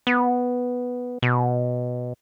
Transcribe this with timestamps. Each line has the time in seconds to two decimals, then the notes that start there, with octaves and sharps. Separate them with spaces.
0.07 B3
1.22 B2